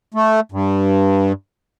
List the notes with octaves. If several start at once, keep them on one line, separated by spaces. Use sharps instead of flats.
A3
G2